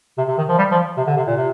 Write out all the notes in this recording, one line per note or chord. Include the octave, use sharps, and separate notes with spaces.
C3
C3
D#3
F3
G3
F3
C3
D3
C3
A#2
C3